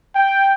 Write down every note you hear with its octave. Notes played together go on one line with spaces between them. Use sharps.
G5